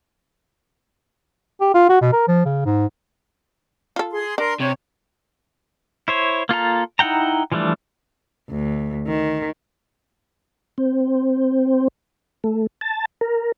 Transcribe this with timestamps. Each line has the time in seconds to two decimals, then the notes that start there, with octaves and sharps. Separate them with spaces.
1.61 G4
1.74 F4
1.89 F#4
2.01 B2
2.13 A#4
2.28 F3
2.45 C#3
2.66 G#2
3.96 F4 A4
4.11 G#4 C6
4.38 D4 A#4 C6
4.60 C3 C#5
6.08 E4 C5 C#5
6.49 A#3 F4 A4 A#5
6.99 D#4 E4 F#5 G5 A#5
7.52 E3 F3 G3 A3 D4
8.50 D2
9.07 D#3
10.78 C4
12.44 A3
12.81 A5
13.21 A#4